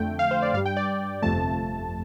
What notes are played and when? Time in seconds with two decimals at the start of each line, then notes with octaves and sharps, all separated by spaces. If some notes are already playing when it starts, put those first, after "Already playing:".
Already playing: F2 D3 A3 G5
0.19 F5
0.31 C5
0.42 D5
0.54 G2 F5
0.57 G3
0.65 G5
0.77 D5
1.22 G1 F2 C3 F3 A3 A5